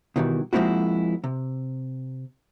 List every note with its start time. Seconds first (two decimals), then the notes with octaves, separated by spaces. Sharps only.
0.16 B2 D#3 E3 G3
0.53 F3 G#3 A#3 C4 E4 F#4
1.24 C3